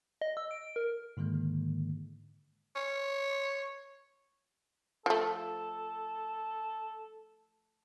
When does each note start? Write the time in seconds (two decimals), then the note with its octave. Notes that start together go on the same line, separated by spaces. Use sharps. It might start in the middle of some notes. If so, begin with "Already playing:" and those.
0.21 D#5
0.37 E6
0.51 D7
0.76 A#4
1.17 G#2 D3 D#3 G#3 A#3
2.76 C#5
5.06 F3 A3 A4